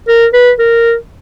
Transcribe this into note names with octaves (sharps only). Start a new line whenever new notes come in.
A#4
B4
A#4